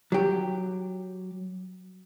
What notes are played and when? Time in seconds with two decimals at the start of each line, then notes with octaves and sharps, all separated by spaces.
0.12 F#3 G4